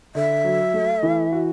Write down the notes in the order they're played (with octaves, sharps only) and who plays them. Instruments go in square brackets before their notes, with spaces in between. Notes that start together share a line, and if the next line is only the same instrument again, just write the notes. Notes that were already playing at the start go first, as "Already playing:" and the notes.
[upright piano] D3 [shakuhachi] E5
[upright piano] F#3
A3
E3
F#4